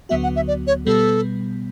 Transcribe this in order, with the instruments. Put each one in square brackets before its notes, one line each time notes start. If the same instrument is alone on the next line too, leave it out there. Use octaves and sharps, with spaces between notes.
[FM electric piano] D2 D3 F#3 B3 F#4 [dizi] E5
[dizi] F#5
E5
D5
C#5
[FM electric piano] B2 G3 B3 [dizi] A4